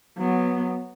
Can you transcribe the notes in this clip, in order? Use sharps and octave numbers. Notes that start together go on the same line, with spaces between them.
F#3 B3